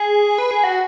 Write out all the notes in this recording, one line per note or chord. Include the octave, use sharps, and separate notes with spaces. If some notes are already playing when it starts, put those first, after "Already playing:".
Already playing: G#4
B4
G#4
F#4